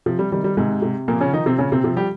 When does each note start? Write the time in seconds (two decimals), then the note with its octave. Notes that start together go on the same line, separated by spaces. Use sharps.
0.06 C3 F3
0.19 G3
0.32 D#3 G3
0.44 G3
0.57 G#2 C3 G#3
0.82 C3
1.08 A#2 F3 A#3
1.21 C#3 C#4
1.33 D#3 F3 D#4
1.46 C3 C4
1.59 A#2 C#3 C#4
1.72 C3 C4
1.84 C3 F3 C4
1.97 G3 G4